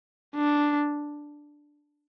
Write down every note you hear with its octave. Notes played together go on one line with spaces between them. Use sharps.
D4